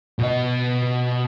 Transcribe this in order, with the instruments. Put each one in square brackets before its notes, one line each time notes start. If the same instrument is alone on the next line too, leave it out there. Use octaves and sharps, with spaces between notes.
[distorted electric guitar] B2 D#5